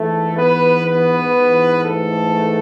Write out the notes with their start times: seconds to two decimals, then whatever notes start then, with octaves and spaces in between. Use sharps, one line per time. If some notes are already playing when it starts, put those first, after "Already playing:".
Already playing: G#2 E3 A3 A4
0.38 B3 B4
0.87 B3 B4
1.36 G#2 E3
1.85 A3 A4